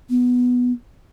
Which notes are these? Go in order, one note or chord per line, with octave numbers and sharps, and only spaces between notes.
B3